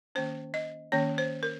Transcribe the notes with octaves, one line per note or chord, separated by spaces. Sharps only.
D#3 A#3 C#4 C5
D#5
D#3 A#3 C#4 C#5
C5
A#4